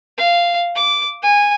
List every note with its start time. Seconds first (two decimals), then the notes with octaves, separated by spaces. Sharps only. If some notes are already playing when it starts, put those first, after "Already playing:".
0.18 F5
0.76 D6
1.23 G#5